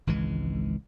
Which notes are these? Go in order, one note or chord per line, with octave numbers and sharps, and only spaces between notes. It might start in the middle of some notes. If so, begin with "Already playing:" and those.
G#1 C#2 E3 G#3